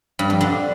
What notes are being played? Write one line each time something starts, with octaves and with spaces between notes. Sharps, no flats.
G2
F2
D3